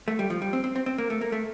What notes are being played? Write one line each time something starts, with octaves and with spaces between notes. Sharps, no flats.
A3
G3
F3
G3
C4
C4
C4
C4
A#3
A3
A#3
A3